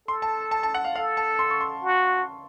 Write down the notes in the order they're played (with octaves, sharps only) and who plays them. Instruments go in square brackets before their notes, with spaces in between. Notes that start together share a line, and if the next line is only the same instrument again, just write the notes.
[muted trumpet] A4 [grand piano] C6
[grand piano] A5
A5
A5
F#5
F5
[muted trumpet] A4 [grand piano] F5
[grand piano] A5
C6
C#6
C6
[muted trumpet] F#4